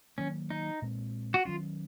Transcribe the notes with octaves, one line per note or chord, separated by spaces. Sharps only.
D#3 F#3 A#3 C#4
D#4
A#2 G#3 C4
F#4
D#3 F#3 C#4 F4